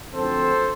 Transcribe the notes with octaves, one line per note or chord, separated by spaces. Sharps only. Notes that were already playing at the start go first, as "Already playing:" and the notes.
D2 D3 F3 C4 A4 C5